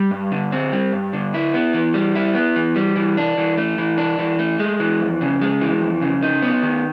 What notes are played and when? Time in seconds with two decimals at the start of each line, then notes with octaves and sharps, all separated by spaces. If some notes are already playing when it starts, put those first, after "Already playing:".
Already playing: G3
0.11 G2
0.31 D3
0.52 C4
0.72 G3
0.93 G2
1.13 D3
1.34 E4
1.54 B3
1.74 E3
1.94 G3
2.16 E4
2.35 B3
2.56 E3
2.76 G3
2.96 E3
3.17 D4
3.38 E3
3.57 A3
3.78 E3
3.98 D4
4.19 E3
4.39 A3
4.59 G#3
4.80 E3
5.00 F2
5.21 C#3
5.41 G#3
5.61 E3
5.81 F2
6.01 C#3
6.22 D#4
6.42 B3
6.62 D#3